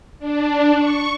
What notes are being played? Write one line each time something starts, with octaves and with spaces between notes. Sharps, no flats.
D4
C#6